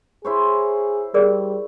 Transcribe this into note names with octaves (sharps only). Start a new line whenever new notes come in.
E4 G#4 C5 C#5
G3 G#4 A#4 D5